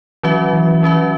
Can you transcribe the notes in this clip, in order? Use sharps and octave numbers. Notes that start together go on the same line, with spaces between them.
E3 F#3 C#4 F#4 B4 E5
E3
F#3 C#4 F#4 B4 E5